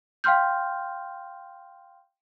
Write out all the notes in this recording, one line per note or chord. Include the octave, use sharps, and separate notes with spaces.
F5 G5 C6 F6 G6